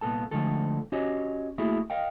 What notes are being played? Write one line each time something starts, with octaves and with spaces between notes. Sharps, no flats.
C2 A#2 B3 A4 A5
D3 F3 G#3 A3 A4
C#4 F#4 G4 C#5 D#5
A3 A#3 E4 F#4 G#4 A4
A#4 D#5 F5 G5